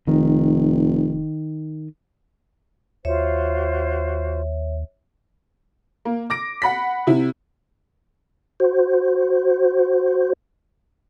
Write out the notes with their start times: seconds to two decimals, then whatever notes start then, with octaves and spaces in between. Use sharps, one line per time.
0.07 F1 D#3
3.05 D#2 F4 F#4 C5 C#5 E5
6.05 A#3
6.30 D6 A#6 D7
6.62 F#5 B5 B6
7.07 C3 E4
8.60 F#4 C5